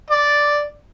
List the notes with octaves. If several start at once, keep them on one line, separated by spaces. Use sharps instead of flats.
D5